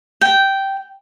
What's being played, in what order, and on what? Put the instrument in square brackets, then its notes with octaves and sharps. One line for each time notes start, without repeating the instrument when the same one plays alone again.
[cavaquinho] G5